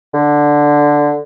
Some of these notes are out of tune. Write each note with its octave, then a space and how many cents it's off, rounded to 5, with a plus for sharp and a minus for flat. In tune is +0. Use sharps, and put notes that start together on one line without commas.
D3 +0